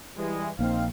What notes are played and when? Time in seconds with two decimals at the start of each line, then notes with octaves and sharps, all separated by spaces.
0.17 E3 G3 G#3
0.59 A#1 A#3 C4 D#4 F5